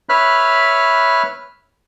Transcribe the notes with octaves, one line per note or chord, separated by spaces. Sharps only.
B4 C#5 E5 B5 F6 F#6